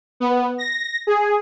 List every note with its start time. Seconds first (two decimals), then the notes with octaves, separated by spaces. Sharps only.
0.20 B3
0.58 A#6
1.07 G#4